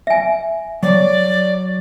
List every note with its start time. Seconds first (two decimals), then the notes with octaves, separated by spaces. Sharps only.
0.07 E5 G#5
0.83 F#3 C#5 D5